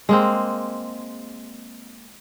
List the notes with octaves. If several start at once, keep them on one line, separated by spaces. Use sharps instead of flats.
G#3 A#3 C4